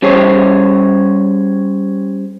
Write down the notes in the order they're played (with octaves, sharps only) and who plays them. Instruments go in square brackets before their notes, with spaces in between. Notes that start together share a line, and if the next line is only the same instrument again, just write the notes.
[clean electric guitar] G3 C#4 G#4 C5 C#5